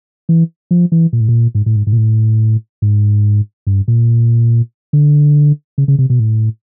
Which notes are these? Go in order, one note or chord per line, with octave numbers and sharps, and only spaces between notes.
E3
F3
E3
A#2
A2
A#2
G#2
A2
G#2
G#2
A#2
A2
G#2
G2
A#2
D3
C#3
C#3
C3
B2
A2